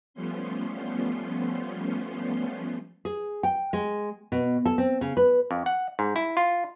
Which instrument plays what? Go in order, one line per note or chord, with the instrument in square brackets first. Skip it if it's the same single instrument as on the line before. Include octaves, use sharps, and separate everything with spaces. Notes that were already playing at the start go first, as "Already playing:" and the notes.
[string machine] F3 G3 A3 B3 C#4 C6
[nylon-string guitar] G#4
G5
G#3
B2
A4
C4
C#3
B4
[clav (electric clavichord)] F2
F#5
G#2
E4
F4